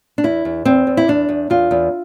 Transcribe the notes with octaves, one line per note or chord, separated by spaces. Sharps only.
D4
E2 E4
E2
E2 C4
E2
E4
E2 D4
E2
E2 F4
E2